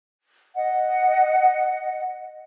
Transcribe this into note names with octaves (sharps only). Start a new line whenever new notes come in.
D#5 F#5